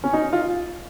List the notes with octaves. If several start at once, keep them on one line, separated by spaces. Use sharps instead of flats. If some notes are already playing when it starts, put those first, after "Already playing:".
C#4
D#4
F4